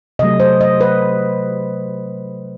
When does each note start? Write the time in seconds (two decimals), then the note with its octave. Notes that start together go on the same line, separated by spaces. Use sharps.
0.19 C3 F#3 A3 D#5
0.40 C5
0.61 D#5
0.81 B4